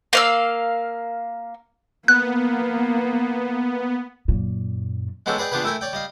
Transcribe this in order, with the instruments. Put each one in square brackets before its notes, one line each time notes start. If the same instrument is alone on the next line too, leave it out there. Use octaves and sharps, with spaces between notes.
[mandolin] A#3 F5 E6
[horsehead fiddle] A#3 [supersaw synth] B3 [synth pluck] F#6
[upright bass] F#2 A#2
[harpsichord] G#3 B3 C#4 F#4 G4 A4
G#4 B4 D5 F#5 G5
B3 D4 F4 G4 G#4 B4
A3 E4 A#4 G5 G#5
C#5 D5 G5
G3 D#5 F5